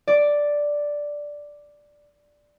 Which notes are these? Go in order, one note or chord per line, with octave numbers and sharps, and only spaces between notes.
D5 D6